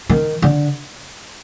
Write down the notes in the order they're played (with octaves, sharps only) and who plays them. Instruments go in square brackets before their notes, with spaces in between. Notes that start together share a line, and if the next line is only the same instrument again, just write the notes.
[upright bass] D#3
D3